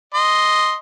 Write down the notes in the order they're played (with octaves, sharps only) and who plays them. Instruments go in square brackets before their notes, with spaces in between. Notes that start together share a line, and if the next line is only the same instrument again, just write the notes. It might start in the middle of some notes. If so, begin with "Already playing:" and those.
[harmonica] D#5 C6